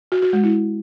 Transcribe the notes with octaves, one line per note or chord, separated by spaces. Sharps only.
F#4
F#4
G#3
E4